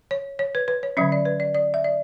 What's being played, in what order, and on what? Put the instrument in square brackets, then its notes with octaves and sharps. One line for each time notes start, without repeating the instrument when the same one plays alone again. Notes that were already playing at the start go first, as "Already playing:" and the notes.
[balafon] C#5
C#5
B4
B4
C#5
D3 F#3 C#4 E5
D5
B4
D5
D5
E5
D5